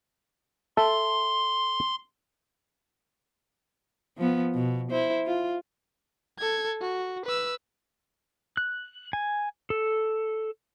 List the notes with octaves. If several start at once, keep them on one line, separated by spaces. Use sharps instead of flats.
A4 E5 A5 C6
F3 B3
B2
E4 C5
F4
A4 G#6
F#4
B4 E6
F#6
G#5
A4